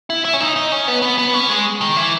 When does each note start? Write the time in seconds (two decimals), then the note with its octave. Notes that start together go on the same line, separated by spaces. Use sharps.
0.10 E4
0.25 E4
0.33 C#4
0.40 D#4
0.56 D#4
0.72 C#4
0.88 B3
1.02 B3
1.18 B3
1.34 C#4
1.49 G#3
1.81 D#3
1.96 E3